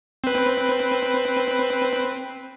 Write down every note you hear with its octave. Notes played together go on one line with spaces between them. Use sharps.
C4 B4